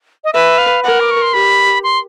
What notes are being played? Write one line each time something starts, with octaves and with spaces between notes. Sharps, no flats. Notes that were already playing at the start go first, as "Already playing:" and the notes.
D#5
B4 E5
F5
A#4 F#5
D6
C#6
C6
G4 B5
C6